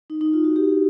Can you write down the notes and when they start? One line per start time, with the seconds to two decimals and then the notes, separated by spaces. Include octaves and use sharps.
0.10 D#4
0.21 D#4
0.33 F4
0.44 F#4
0.56 G4